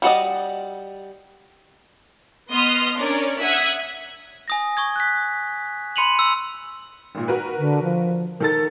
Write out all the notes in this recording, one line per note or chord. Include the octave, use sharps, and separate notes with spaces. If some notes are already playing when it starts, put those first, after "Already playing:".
G3 F#4 D5 D#5
B3 D#5 C6 D#6 F6
C#4 D4 A#4 C#5 D5
E5 F#5 D#6 F#6 G#6 B6
G#5 D#6 A#6
C#6 D#6 G#6
F#6 B6
B5 C6 C#7 D#7 F7 F#7
E6
G#1 A#2
F#4 A#4 B4
D3
F3
D#3 A4 A#4 A6